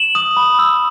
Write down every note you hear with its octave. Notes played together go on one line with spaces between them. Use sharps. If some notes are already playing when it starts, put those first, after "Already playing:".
Already playing: E7 F#7
D#6
B5
E6